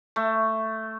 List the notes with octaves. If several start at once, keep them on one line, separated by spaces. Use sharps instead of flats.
A3